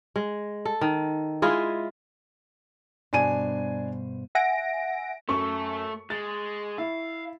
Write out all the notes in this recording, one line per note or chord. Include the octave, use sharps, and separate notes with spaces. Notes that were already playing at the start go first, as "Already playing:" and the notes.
G#3
A4
D#3
G#3 E4 F4 G#4
G2 B2 D4 C5 G#5 D#7
E5 F#5 G#5 A#6 D7
F#2 A3 A4 C#6
G#3 A6
E4 F5